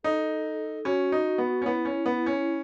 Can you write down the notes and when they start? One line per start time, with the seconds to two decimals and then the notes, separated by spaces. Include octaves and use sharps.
0.04 D#4 A4
0.85 C#4 F#4
1.12 D#4
1.38 B3
1.62 C#4
1.65 B3 E4
1.85 C#4
2.06 B3
2.26 C#4